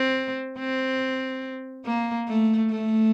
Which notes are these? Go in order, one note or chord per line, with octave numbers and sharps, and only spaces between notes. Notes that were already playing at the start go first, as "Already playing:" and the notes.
Already playing: C4
C4
A#3
A3
A3